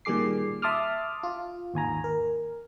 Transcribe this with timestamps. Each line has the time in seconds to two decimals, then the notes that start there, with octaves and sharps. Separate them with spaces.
0.05 A#2 D#3 G3 G#4 D6 C7
0.62 E5 A5 C6 D6 D#6 F6
1.23 F4
1.74 G#1 D#2 G#5 A#5
2.04 A#4